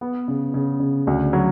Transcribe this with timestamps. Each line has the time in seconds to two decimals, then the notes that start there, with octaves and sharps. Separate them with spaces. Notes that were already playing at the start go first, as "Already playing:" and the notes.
0.01 B3
0.28 C#3
0.54 C#3
0.80 C#3
1.07 D2
1.33 F#3